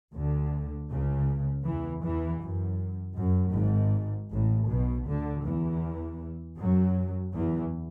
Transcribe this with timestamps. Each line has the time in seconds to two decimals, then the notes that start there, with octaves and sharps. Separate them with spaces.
0.13 D2 D3
0.89 C#2 C#3
1.65 E2 E3
2.03 E2 E3
2.42 F#2
3.17 F#2
3.54 G#1 G#2
4.30 A1 A2
4.68 B1 B2
5.06 D2 D3
5.43 E2 E3
6.57 F#2 F#3
7.33 E2 E3